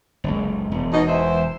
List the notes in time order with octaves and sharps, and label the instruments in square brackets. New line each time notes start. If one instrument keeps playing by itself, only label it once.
[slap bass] F#1 C#2
E1
[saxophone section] B2 D#4
E2 C5 E5